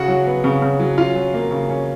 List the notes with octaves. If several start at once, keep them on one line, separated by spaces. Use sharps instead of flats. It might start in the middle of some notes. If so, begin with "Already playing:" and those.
Already playing: C#3 F#4 F#5
F#3
B3
C#3
C#3
F#3
C#4 F4 F5
F#3
A#3
C#3
C#4